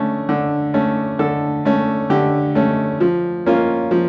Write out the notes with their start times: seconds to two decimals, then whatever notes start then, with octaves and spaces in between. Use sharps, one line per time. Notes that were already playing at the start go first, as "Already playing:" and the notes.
Already playing: D3 A3 C#4
0.29 D3
0.74 A3 C#4
1.19 D3 A4
1.65 A3 C#4
2.10 D3 G4
2.55 A3 C#4
3.00 F3
3.46 A#3 C#4 F4
3.91 F3